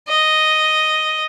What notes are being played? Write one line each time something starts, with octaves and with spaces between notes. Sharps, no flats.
D#5